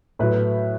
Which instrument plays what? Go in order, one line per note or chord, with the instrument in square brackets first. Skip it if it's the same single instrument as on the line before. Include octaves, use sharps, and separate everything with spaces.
[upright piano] A2 F#3 B4